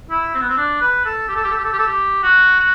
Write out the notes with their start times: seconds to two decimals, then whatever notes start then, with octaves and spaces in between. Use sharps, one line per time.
0.10 E4
0.35 C4
0.41 B3
0.49 C4
0.57 D4
0.81 B4
1.05 A4
1.28 G4
1.36 A4
1.44 G4
1.51 A4
1.57 G4
1.64 A4
1.73 G4
1.79 A4
1.86 G4
2.23 F#4
2.59 F#4